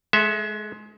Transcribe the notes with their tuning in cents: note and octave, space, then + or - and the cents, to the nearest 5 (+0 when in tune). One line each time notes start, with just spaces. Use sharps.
G#3 +25 A4 +0 E5 -5